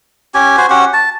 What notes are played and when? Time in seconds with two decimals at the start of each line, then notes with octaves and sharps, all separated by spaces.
0.34 C#4 G4 G#5
0.57 F#4 C5 G#5
0.70 C#4 F#4 G4 F#5
0.93 A5